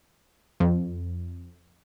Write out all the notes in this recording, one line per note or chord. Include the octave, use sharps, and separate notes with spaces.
F2